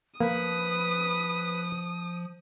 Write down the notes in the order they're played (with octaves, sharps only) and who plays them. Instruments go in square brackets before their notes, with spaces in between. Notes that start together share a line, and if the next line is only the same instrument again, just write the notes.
[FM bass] F3 [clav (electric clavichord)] A#3 [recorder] B4 [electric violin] D#6